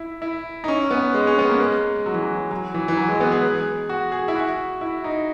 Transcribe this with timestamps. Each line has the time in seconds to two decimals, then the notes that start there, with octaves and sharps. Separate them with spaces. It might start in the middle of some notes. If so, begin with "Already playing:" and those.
Already playing: E4
0.22 E4
0.64 D#4
0.68 C#4
0.91 B3
1.14 G#3
1.27 C#4
1.39 B3
1.49 A#3
1.60 G#3
2.06 F#3
2.14 E3
2.23 F#3
2.51 F#3
2.74 E3
2.88 E3
2.97 F#3
3.09 G#3
3.20 B3
3.32 G#4
3.89 F#4
4.12 G#4
4.28 E4
4.35 F#4
4.81 E4
5.04 D#4